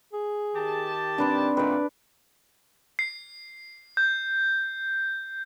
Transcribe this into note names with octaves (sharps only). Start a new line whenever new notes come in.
G#4
D#3 G4 A5
C4 D4 B4 D6
A#2 D#3 A3 B4 D5
C7
G6